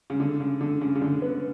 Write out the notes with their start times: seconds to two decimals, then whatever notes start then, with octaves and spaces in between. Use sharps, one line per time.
0.10 C#3
0.20 D3
0.40 C#3
0.61 D3
0.81 C#3
0.95 C#3
1.02 D3
1.22 B3